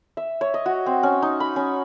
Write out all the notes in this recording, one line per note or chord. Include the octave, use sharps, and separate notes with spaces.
E5
C#5
D#5
F#4
C4
C#4
D#4
B5
C#4